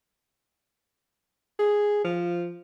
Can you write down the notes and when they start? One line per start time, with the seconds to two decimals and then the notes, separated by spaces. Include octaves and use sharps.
1.59 G#4
2.05 F3